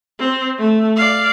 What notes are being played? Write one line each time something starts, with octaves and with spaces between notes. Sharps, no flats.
C4
A3
D5 F5